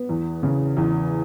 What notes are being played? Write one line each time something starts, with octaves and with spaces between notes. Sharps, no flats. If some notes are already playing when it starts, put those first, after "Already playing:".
Already playing: B3
E2
C#3
E2